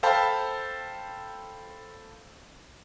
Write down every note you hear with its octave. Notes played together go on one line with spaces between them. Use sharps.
A4 C5 F5 G5 A5 B5